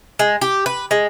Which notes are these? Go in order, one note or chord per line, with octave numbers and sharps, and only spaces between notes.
G#3
G4
B4
G#3